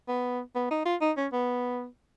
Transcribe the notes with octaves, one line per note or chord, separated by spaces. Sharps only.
B3
B3
D#4
F4
D#4
C#4
B3